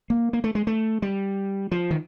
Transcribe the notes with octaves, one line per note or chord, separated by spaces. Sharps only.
A#3
A#3
A3
G#3
A3
G3
F3
D#3